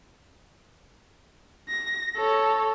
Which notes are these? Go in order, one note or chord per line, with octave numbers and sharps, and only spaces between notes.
A#6
A4 C#5